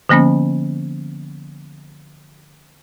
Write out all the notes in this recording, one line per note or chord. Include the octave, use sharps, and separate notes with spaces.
D3 F3 A#3 B3 C#4